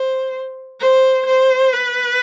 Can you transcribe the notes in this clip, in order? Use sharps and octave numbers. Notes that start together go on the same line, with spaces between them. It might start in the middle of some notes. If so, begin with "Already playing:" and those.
Already playing: C5
C5
C5
B4